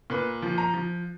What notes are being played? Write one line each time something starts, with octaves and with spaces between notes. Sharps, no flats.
A#2 B4
F3
A#5
F3